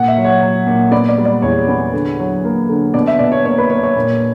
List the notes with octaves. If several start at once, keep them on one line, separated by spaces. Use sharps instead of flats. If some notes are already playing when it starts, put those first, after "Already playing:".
Already playing: A#2 F#5
E5
F#3
C#5
F#3
A#2
B3 D5
D5
G3
D5
E2 C#5
B3
D3
F#3
A#3
D3
B2 D5
E5
B2 D5
C#5
A#3 C#5
B4
A#3 C#5
C#5
A#2